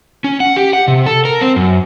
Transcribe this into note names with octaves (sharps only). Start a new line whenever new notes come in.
C#4
F#5
G4
F#5
C3
A4
A#4
C4
F#2